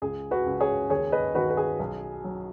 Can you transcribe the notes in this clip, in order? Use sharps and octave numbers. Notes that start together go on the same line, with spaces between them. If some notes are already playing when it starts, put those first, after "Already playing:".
C#2 G#4
F#4 B4
C#2
G#4 C#5
D#2 G#4 C#5
B4 D#5
D#3 F#4 B4
B4
G#4
B1
F#3